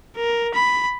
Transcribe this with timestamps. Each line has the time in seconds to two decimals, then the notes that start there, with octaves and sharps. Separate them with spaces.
0.16 A#4
0.54 B5